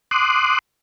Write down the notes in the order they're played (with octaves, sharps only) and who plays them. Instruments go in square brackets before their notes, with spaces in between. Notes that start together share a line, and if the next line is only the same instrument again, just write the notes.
[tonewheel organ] C6 D6 D#6 F#6